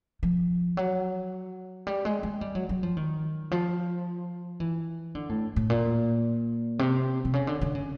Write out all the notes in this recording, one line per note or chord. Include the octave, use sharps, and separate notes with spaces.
F3
F#3
G3
G#3
G#3
G3
F#3
F#3
F3
D#3
F3
E3
D3
A2
A2
A#2
C3
C3
C#3
D3
D3
C#3